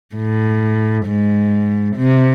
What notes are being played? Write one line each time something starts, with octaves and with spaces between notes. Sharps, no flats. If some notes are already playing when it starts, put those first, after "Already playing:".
A2
G#2
C3